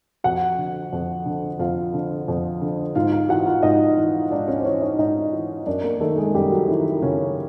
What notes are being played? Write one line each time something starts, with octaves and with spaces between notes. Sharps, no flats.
F2 F#4 F#5
D3
F2
D3
F2 F4 F5
D3
F2
D3
G#2 F4 F5
F4 F5
E3 F#4 F#5
F4 F5
G#2 D#4 D#5
E3
G#2 D4 D5
C#4 C#5
C5
E3 C#4 C#5
D#4 D#5
G#2 D#4 D#5
E3
F#2 D4 D5
A#3 A#4
D#3 A3 A4
G#3 G#4
F#2 G3 G4
F#3 F#4
D#3 E3 E4
F#2 C#3 C#4